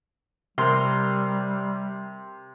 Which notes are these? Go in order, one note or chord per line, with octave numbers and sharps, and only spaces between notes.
C3 G3 A#4 C6